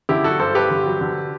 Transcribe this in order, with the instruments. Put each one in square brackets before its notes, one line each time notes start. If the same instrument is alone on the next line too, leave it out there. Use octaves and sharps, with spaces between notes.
[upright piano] D3 E4 G4
F#3 F#4 A4
G2 A4 C5
G2 G4 B4
D3
F#3
D3